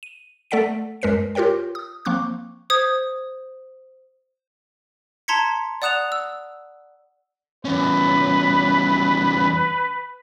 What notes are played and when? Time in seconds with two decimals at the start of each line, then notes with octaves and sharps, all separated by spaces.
0.03 D#7
0.51 A3 A4 D5 F#5 B6 D7
1.02 F#2 G#3 A#4 B4 C7 C#7
1.35 F4 G4 A#4 C#5 G5
1.75 D#6
2.05 F3 A#3 C4 C#6 D6 F#6
2.70 C5 D#6 G#6
5.28 A5 A#5 C6 G#6 B6 C#7
5.82 D5 F#5 D#6 F#6 E7 F7
6.12 E6
7.65 E2 C#4 B4